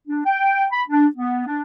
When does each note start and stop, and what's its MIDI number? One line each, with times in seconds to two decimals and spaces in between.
0.08 0.21 62
0.26 0.65 79
0.71 0.82 83
0.88 1.06 62
1.16 1.45 59
1.46 1.61 62